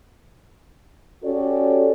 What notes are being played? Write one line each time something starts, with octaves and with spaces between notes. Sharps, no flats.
C#4 F#4 G4 A4 C#5 D5